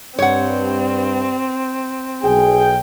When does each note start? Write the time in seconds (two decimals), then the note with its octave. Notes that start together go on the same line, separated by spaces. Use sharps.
0.19 G2 C4 C#5 F#5
2.23 B1 G#4 G5